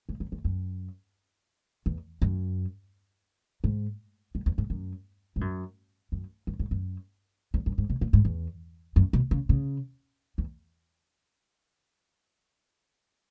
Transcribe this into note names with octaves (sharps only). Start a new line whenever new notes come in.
G#2
F#2
E2
F#2
E2
F#2
G#2
F#2
E2
G#2
F#2
G#2
F#2
F#2
F#2
G#2
F#2
E2
F#2
G#2
B2
A#2
G#2
E2
F#2
B2
C#3
C#3
E2